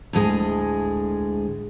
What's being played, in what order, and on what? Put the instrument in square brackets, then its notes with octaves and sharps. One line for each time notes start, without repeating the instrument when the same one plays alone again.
[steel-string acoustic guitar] D2 A2 G#3 G#4